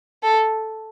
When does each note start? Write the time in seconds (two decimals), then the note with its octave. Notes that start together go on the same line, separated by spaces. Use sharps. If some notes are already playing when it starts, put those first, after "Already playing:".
0.23 A4